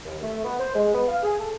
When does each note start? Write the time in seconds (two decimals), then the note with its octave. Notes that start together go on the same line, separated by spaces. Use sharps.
0.04 D#2
0.23 A3
0.44 B3
0.58 C5
0.75 G#3
0.94 B3
1.08 F5
1.22 G#4
1.40 A4